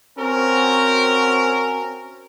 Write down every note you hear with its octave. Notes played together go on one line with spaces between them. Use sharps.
C4 C#4 F#4 A#4